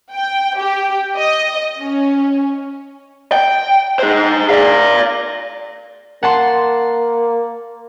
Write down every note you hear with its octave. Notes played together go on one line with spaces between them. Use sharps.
G5
G4
D#5
C#4
G5
G#4 C5
D5 F5
A#3 F#5 A5 C6